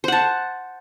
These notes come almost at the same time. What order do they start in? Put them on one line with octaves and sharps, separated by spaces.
C5 F#5 A5